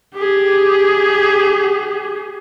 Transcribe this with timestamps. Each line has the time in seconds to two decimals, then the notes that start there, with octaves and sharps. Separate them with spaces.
0.14 G4 G#4